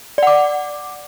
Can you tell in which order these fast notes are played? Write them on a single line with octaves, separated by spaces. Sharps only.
D5 F#5 D6